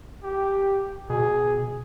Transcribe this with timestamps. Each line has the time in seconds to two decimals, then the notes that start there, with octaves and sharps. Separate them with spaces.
0.24 G4
1.10 B2 G#4